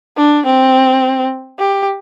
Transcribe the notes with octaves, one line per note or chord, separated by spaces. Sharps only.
D4
C4
G4